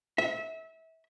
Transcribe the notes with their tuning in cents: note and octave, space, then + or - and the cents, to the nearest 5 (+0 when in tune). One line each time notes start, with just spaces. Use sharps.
E5 -25